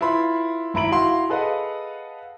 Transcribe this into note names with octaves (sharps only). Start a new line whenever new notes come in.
E4 F4 B4 B5 C6
G#1 E4 A#5 B5 D7 F#7
E4 F#4 F5 C6
G#4 A4 B4 D#5 F5 F#5